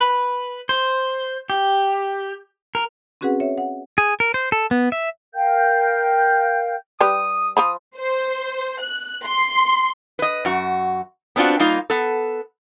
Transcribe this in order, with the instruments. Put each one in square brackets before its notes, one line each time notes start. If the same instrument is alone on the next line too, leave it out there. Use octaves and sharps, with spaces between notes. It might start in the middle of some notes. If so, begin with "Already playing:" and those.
[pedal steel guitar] B4
C5
G4
A#4
[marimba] C4 C#4 F#4 G#4 B4 F#5
C#5 E5
F#5
[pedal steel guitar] G#4
A#4
C5
A4
B3
E5
[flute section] A#4 F5 G5 G6
[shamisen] G3 G4 B4 [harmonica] D#6
[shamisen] F3 C5 B5 [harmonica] D#6
[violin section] C5
F#6
C6
[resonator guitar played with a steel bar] B4 D#5
F#2 F#4
B3 C4 D4 F4 F#4
G3 A#3 D#4 F4 F5
B3 A4